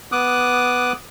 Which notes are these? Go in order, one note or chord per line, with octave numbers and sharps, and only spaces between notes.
B3 D6 D#6 F#6